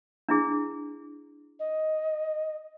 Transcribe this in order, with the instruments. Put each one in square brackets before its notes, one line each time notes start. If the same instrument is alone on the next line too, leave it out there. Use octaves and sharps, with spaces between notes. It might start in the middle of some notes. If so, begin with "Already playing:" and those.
[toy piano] D4 E4 G#4
[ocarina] D#5